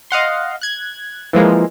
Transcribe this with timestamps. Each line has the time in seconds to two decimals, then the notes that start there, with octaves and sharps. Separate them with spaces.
0.10 D#5 F5 F#5 C6
0.61 F#6 G#6
1.33 E3 F3 G#3 A#3